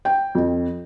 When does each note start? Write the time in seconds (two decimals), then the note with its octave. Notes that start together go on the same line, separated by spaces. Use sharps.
0.05 G5
0.35 F2